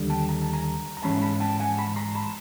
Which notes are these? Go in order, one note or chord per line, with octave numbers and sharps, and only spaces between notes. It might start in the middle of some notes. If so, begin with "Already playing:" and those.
Already playing: D#2 D3 G3
G5 A5
A#5
A5
G#5 A#5
A#5
G#2 E3 G#3 C#4 A5 B5
A5 B5
G5 A5
F#5 G#5
A5 B5
A#5 C6
A5 B5